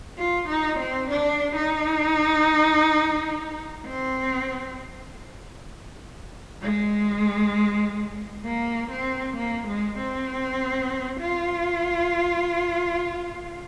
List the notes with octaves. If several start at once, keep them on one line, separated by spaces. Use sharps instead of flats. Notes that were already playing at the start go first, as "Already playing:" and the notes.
F4
D#4
C4
D4
D#4
C4
G#3
A#3
C4
A#3
G#3
C4
F4